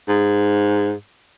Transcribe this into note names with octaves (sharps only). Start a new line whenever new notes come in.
G#2